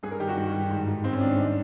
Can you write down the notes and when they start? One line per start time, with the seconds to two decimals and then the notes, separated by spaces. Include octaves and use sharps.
0.03 G2 G#4
0.11 A#4
0.20 D#3 G4
0.28 F#4
0.37 G2
0.54 D#3
0.70 G#2
0.87 D#3
1.04 G#2 C4
1.13 C#4
1.21 D#3 D4
1.30 D#4
1.38 G2 D4